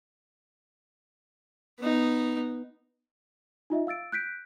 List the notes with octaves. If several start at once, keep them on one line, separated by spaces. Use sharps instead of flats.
B3 D#4
D#4 F4 D#5 E5
F5 E6 A6 D7
F#6 G6 B6 D7